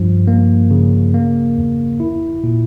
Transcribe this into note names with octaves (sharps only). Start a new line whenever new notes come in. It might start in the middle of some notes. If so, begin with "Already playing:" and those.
Already playing: G2 F3
A#3
C#3
A#3
E2
E4
A#2